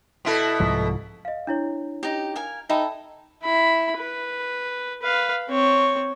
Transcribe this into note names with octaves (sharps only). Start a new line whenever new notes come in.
B2 E4 A4
C2 G#2 F3
D#5 F5
D4 E4 C#5
D#4 G4
A#4 F5 G#5
D#4 A4 E5 G5 B5
E4 B5
B4
B4 F5
C4 C#5